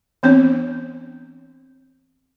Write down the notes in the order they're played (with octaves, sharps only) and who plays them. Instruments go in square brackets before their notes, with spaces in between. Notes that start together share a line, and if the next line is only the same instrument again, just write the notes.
[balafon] E3 B3 C4 D4 C#5